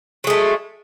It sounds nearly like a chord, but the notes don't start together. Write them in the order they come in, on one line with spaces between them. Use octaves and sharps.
F#3 G#3 A3